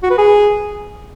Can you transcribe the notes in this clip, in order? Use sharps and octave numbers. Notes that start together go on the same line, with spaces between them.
F#4
B4
G#4